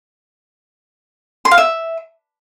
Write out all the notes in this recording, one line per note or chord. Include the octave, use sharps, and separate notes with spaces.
C6
F5
E5